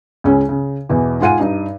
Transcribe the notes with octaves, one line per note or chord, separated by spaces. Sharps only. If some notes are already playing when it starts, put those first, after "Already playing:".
C#2 C#3 C#4
C#3
E2 B2 E3
G#2 F4 F#5 G#5 D#7
G2 D#4